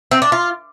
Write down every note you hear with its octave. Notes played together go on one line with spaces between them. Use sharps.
C4
D4
F4